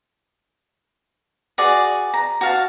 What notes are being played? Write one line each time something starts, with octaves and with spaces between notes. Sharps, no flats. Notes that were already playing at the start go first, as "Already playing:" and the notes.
F#4 G#4 D5
A#5
F#4 F5 A5